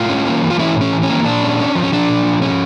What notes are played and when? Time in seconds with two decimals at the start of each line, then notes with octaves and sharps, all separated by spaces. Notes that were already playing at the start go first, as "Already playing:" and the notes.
Already playing: A2 F4
0.09 C#4
0.27 A#3
0.43 E3
0.50 F4
0.59 C#4 E4
0.76 A2
0.81 C#4
0.93 E3
1.03 C#4
1.09 A#3
1.25 A#2 D4
1.43 C#4
1.59 C#4
1.75 F3
1.83 C#4
1.92 F3 D4
2.09 A#2
2.25 F3
2.42 C#4